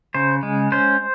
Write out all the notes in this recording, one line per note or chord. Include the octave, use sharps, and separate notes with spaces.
C#3 C5
G#3
C#4 C5